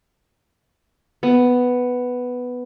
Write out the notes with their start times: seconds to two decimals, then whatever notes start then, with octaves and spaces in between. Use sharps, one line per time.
1.23 B3